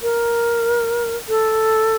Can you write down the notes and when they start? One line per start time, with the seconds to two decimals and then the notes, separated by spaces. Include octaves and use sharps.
0.02 A#4
1.29 A4